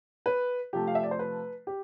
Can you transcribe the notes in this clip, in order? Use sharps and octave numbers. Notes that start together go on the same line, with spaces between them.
B4
C3 F3 A3 G4
F5
E5
D5
C5
B4
G4